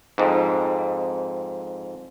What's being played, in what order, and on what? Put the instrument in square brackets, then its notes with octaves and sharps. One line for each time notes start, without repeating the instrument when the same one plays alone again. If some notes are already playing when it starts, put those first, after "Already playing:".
[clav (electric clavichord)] F2 G#2